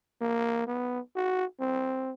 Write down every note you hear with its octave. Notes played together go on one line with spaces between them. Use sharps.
A#3
B3
F#4
C4